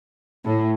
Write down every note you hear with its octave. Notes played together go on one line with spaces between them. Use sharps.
A2